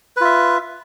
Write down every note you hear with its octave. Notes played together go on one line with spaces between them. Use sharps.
F4 B4 E5